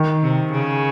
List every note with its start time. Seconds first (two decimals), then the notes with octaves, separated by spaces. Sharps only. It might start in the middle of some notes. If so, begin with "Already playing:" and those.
Already playing: D#3
0.22 C3
0.52 C#3